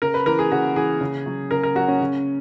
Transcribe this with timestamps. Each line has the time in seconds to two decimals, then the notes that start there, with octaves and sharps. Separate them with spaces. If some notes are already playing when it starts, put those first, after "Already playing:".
0.02 C#3 A#4
0.14 B4
0.26 E3 A#4
0.39 G#4
0.52 C#3 F#4
0.76 E3 G#4
1.01 C#3
1.26 F#3
1.51 C#3 A#4
1.63 A#4
1.75 F#3 F#4
1.88 C#4
2.01 C#3